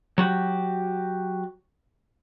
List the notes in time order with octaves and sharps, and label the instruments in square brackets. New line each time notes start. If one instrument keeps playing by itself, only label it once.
[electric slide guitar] F#3 F#4 G4